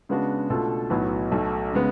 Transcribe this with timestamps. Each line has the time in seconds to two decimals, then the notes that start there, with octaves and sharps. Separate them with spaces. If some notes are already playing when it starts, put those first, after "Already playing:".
0.09 C#3 G#3 B3 D4 F#4
0.50 B2 A3 D4 F4 A4
0.90 B1 A2 F#3 B3
1.31 B1 B2 A3
1.73 C#3 G#3 B3